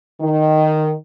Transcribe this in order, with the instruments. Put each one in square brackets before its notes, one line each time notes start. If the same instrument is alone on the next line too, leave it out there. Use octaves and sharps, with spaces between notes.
[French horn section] D#3